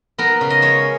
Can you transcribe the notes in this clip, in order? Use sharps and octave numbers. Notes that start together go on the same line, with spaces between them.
B3 A#4
C#3
D#5
G#3 C#5